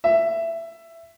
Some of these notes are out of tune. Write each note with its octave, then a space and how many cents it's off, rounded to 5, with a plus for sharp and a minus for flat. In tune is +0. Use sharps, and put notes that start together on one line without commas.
E5 +15